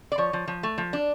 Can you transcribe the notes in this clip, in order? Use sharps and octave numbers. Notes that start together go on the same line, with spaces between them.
D5
F3 C#5
F3
F3
A3
F3
D4